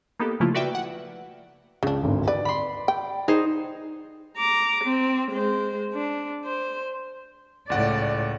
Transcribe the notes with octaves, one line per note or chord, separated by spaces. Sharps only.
A#3 B3 D#4 G4 A4
C#3 F3 A3 A#3 E4 F4
F#4 B4 D5 E5 G5
F#5
C#2 C#3 D4
G#1 D2
B4 D5
B5 C6
G5
D#4 G#4 C5
A#5 D6
C4
G#3 C5
D4
C5
C#2 A2 D5 F#5